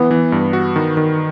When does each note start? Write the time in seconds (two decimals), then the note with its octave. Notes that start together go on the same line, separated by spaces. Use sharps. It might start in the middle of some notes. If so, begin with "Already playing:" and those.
Already playing: E3 B3
0.11 E3
0.32 G2
0.53 F#4
0.76 D#3
0.97 D#3